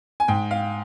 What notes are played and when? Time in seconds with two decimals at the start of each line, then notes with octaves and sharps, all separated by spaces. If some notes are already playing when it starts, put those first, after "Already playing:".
0.20 G#5
0.28 G#2 G5
0.51 F5